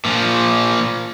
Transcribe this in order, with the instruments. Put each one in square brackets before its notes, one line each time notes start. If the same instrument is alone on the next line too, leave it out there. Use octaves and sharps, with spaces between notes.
[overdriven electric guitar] A#2 F3